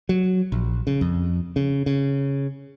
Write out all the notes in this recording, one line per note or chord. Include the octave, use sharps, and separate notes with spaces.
F#3
A#1
C#3
F2
C#3
C#3